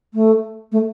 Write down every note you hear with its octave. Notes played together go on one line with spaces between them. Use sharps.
A3
A3